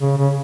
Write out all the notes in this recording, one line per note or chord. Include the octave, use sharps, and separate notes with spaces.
C#3
C#3